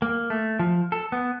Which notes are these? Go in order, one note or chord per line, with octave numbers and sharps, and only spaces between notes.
A#3
A3
F3
A4
B3